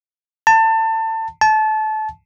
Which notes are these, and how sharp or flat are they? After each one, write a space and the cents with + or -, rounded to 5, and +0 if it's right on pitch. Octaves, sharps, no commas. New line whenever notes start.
A5 +25
A5 -25